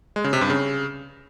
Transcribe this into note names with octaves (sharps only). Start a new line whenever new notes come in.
G#3
C#3
C3
G2
C#3